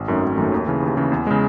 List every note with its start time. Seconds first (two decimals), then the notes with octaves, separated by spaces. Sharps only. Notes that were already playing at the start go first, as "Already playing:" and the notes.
Already playing: G#1
0.08 F#2 D#3 A3 C#4
0.23 G#1
0.38 F#2 D#3 A3 C#4
0.52 D#2
0.67 C#3 E3
0.82 D#2
0.97 C#3 E3
1.12 E2
1.27 C#3 G#3